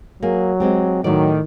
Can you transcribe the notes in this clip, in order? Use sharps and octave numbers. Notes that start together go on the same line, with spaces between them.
F#3 A#3 G#4
G#3 C4 G4
A2 D#3 F#3 D5